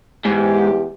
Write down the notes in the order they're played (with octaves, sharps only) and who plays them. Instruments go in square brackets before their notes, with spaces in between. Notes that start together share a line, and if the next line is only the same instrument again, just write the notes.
[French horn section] E2 G4 [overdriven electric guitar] G#2